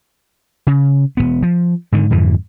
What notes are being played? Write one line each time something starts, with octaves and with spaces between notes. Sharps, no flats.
C#3
E1 D#2 B3
F3
G#2 D3 D#3
F2 G#2 D3 E3